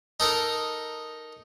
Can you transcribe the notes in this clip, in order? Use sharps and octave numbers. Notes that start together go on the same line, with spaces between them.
D#4 A4 A#4